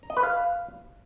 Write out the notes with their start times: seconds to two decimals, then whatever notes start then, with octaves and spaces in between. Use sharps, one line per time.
0.03 A#5
0.10 D#5
0.17 B4
0.23 F5